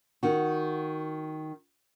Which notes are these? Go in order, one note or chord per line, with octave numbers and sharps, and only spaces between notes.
D#3 F#4